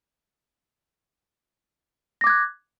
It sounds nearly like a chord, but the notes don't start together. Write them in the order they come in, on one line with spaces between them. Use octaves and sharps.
A#6 D6 G#6 F#6